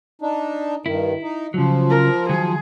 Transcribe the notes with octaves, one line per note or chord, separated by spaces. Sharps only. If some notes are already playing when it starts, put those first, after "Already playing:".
D4 D#4
G2 D#3 E4
D#4
C#3 F3 F#3
A#4
D#3 F#3 G#4